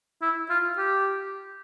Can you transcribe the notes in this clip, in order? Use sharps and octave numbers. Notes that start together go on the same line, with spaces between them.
E4
F4
G4